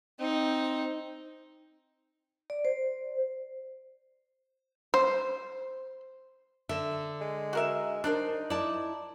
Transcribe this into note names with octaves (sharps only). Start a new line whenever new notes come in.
C4 D#4
D5
C5
C5
D3 E5
G#3
F#4 A#4 E5
D4 D#4 A#4 C5 D5
E4 D5 A5